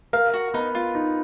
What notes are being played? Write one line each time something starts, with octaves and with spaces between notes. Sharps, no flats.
A#4 F5
F#4
B3 D#4
F4
D#4